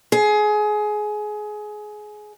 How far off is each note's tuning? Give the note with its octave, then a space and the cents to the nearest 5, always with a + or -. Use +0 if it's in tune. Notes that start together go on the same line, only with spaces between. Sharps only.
G#4 +20